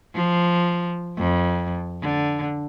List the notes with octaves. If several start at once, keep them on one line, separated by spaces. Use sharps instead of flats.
F3
F2
D3